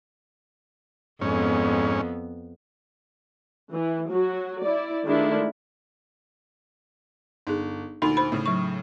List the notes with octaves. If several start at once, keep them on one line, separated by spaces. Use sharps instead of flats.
F2 G#2 B3 C#4
E3
F#3 F#4
E4 D5
D#3 G#3 A3 D4 E4 F4
G1 D#4 G#4
D2 A#2 D#4 B5 C6 F7
C5 B5
A2 C#3
F#3 C#6